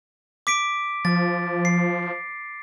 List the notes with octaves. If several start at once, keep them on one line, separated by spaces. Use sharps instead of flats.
D6 B6 D7
F3 A6
C7